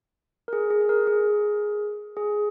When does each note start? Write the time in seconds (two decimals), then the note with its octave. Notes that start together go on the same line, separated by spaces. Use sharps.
0.48 A#4
0.53 G#4
0.70 G#4
0.81 G#4
0.89 A#4
1.07 G#4
2.17 G#4